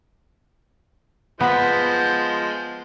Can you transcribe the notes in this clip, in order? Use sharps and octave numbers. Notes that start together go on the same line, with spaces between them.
F3 G#3 B3 C5 B6